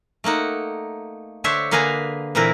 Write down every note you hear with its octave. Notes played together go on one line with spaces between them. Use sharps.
A3 A#3 D#4 F#5
D3 D4 C5 C#5 E5
D3 A#3 G#4 B4 G#5 A#5
A#2 E3 C4 E4 A#4 B4